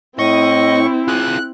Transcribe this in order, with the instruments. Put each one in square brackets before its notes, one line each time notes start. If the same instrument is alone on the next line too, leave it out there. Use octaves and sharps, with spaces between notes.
[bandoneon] A2 C#6 [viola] C4 E4 [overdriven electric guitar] D#5
[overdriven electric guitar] F4 G#4 [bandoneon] F#6